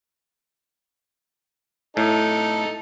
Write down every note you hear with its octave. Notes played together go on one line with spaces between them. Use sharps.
A2 D#4 A4